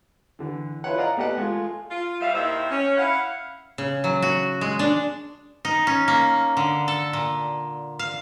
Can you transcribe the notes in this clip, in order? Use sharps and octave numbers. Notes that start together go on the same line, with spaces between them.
D3 E3
E4 F4 B4 C#5 F#5
D5 D#5 F5 F#5 A#5
A3 B3 G4 D#5 F#5 A5
G#3 A3 F4
F4
G3 E5 F5
D#2 D#3 D#4 E4 C5 E5
C#4
E4 F5 F#5
C#3
F#3
F#4
G#3
D4
D#4
C#4
A#3
D3
A4
A#2
F5